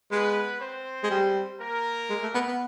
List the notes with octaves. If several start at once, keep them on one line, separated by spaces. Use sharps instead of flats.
G#3 B3 B4
C4 C5
G#3
G3
A#3 A#4
G#3
A3
B3
B3